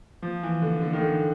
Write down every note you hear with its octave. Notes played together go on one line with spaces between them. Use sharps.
F3
E3
D3
D3
D#3
D3